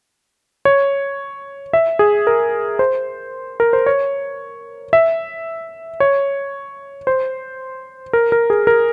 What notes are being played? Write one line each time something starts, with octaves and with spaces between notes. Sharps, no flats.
C#5
E5
G#4
A#4
C5
A#4
C5
C#5
E5
C#5
C5
A#4
A#4
G#4
A#4